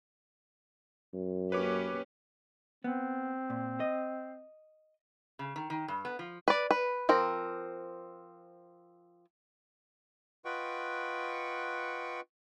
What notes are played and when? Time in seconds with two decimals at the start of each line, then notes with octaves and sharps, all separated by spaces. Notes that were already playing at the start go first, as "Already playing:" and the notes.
1.14 F#2
1.52 A#3 C#4 G4 B4 C#5 D6
2.84 B3 C4
3.50 A#2
3.80 D#5
5.39 C#3
5.56 D#3
5.70 D#3
5.88 G2
6.05 B3
6.19 F3
6.48 B4 D5
6.71 B4
7.09 F3 C4 A#4
10.45 F4 B4 D#5 F#5 G5 C#6